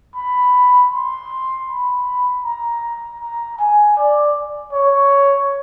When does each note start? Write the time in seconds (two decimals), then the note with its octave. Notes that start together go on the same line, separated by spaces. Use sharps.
0.16 B5
0.93 C6
1.69 B5
2.45 A#5
3.20 A#5
3.58 G#5
3.97 D5
4.73 C#5